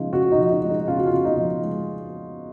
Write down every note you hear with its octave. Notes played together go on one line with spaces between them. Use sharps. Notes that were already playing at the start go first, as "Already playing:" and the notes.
Already playing: C#3 F3 G#3 D#4 F4
C#3 F#4
D#4
F3
D#4
G#3
D#4
C#3 F4
F#4
F4
C#3
D#4
F3
G#3